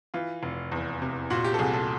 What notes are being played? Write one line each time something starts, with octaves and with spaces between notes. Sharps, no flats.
E3 F4
F1
E2
C3
A#2 F#4
G4
A4
C2 G#4
A4